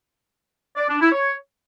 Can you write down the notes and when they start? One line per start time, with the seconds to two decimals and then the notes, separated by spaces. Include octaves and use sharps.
0.76 D5
0.88 D4
1.00 E4
1.12 C#5